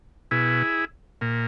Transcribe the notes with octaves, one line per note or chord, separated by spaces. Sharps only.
B2 E4 G#4
A#2